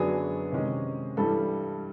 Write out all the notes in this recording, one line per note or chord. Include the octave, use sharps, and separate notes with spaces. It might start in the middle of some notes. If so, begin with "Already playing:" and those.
Already playing: F#2 D3 F#3 B3 D4 G#4
C3 D#3 G#3 C#4
G2 E3 G3 A4